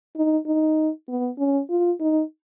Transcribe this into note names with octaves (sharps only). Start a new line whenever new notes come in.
D#4
D#4
B3
C#4
F4
D#4